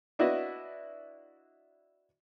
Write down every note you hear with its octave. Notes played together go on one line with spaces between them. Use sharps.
D4 E4 F#4 B4 D#5